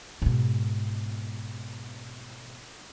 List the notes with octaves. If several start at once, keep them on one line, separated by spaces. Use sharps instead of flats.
G#2 B2